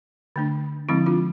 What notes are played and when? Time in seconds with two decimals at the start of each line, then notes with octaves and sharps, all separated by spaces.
0.36 D3 A3 D4
0.89 D3 F3 G#3 C4 E4
1.06 D4 F4